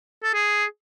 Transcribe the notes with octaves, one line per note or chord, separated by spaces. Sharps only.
A4
G#4